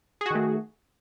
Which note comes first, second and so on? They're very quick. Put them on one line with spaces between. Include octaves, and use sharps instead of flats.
G#4 F#4 D#3 A3